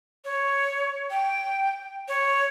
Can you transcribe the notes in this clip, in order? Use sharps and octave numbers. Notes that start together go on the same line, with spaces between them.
C#5
G5
C#5